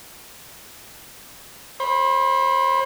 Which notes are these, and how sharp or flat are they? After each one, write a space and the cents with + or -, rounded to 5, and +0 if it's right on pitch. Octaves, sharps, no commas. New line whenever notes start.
C5 +35 B5 +0